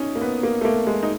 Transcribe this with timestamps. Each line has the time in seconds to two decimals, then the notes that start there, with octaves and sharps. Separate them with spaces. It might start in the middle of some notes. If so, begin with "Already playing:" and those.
Already playing: C#4 D#4
0.15 A#3
0.21 B3
0.43 A#3
0.61 A3
0.65 A#3
0.87 G#3
1.03 D#4